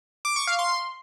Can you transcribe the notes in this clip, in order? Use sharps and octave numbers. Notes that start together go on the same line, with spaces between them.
D6
C#6
F5
C6